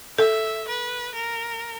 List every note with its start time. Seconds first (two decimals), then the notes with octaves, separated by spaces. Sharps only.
0.18 A4 E5
0.68 B4
1.15 A#4